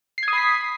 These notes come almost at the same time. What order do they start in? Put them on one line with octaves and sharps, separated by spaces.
C7 G#6 D#6 B5 B6